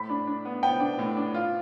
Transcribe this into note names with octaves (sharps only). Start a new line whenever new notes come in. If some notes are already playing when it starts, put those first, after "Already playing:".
Already playing: A2 B5
D4
D4
B3
B3 G5
D4
A2
D4
F4